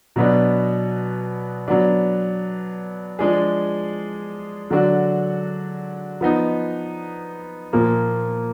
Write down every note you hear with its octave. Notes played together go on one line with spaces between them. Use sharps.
B2 F#3 B3 D4
F#3 B3 D4
F3 G#3 D4 G#4
D3 F#3 D4 F#4
F3 B3 D#4
A#2 F3 A#3